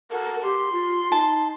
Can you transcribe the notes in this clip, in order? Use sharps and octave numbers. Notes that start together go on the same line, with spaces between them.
F#4 A4 A#4
G4 C6
F4
D#4 A5